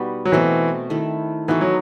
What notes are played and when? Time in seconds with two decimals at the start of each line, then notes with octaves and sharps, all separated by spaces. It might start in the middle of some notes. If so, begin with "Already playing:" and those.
Already playing: B2 G3 B3 D#4 F#4 B4
0.25 F#3
0.32 B2 E3 A3 C4
0.90 D#3 A3 E4
1.48 E3 B3 D#4 F#4 A4
1.61 F#3